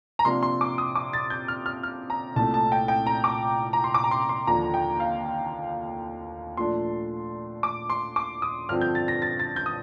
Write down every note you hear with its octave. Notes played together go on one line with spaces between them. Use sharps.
A#5
C3 F3 A#3 D4 C6
C6
D6
D#6
D6
A6
G6
F6
F6
F6
A#5
C2 A#2 A3 A5
A5
G5
G5
A#5
D6
A#5
C6
D6
A#5
C6
C6
D#2 D3 F3 A#5
G5
F5
A#2 F3 A3 D4 C6
D6
C6
D6
D#6
G2 D3 F3 C4 F6
G6
A6
A#6
A6
A6
G6
D#6